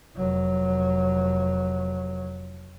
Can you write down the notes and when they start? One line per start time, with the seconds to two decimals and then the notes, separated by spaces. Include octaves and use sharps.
0.16 F1 F#3